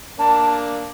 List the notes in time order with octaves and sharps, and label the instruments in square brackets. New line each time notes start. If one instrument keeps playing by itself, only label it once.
[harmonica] A#3 D4 [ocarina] A5